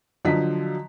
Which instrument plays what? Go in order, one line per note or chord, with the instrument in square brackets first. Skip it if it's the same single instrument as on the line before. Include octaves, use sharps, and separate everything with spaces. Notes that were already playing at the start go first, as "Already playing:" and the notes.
[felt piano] D3 F3 F#3 D#5 B6